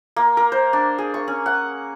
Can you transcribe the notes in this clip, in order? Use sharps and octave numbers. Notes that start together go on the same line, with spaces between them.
A#3
A#4
C5
D4
G#4
C#6
C#4
F#5